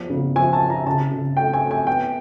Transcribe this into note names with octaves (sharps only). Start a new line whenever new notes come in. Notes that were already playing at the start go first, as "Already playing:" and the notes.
Already playing: E2 F3
C#3
F3 G#5
A5
F3
A#5
C#3 A5
C#3
A3 G5
G#5
A3
G#5
B3 G5